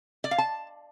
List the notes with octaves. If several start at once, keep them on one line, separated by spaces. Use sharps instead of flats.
D5
F5
A5